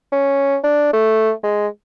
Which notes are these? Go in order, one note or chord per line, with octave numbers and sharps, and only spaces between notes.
C#4
D4
A3
G#3